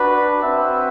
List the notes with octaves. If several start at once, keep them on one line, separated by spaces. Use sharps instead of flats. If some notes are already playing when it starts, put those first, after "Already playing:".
Already playing: D4 F#4 B4
C4 F#4 B4 E5